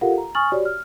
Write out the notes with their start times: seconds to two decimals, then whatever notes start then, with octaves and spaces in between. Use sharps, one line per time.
0.01 F4 G4 A4 A#4 F5 F#5
0.18 A#5
0.35 G#5 C#6 D#6 F6 A6 F#7
0.52 F#4 G4 C#5 D5
0.65 F6